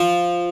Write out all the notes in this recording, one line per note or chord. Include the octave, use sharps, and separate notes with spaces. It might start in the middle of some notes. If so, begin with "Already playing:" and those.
Already playing: F3